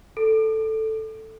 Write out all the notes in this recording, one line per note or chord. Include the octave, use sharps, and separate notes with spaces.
A4